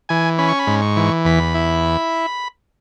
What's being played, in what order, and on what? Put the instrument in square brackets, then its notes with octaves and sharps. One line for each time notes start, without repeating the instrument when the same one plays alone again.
[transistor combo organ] E3 G#5
C#4 B5
C#6
B5
G#2
C#6
E3
E2 B5
E4